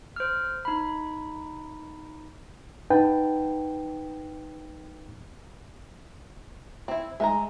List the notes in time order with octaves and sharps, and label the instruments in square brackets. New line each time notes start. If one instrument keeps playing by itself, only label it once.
[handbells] C5 F6
D#4 B5
[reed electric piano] D#4 B4 F#5 G5 A5
[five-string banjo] C4 E4
[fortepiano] G#3 [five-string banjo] E5 F#5 A#5